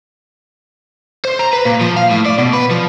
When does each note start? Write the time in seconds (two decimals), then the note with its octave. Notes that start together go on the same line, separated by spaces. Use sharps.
1.25 C5
1.39 A#5
1.53 B4
1.65 A#2
1.81 F3
1.96 F5
2.11 A2
2.26 D5
2.38 B2
2.53 B4
2.71 F3